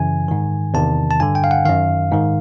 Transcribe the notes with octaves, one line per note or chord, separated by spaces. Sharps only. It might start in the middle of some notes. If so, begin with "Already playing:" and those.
Already playing: F#2 C#3 E3 G#5
G#2 D#3
E2 C3 D#3 A5
A5
G2 D3 G#5
G5
F5
F#5
F#2 D#3 F5
G#2 D#3